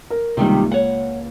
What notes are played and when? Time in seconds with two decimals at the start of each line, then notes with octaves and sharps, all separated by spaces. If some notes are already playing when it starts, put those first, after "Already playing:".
0.10 A#4
0.37 C#2 C3 D#3 G3 A#3
0.71 C#5 F#5